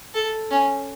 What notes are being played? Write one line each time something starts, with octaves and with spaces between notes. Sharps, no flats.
A4
C#4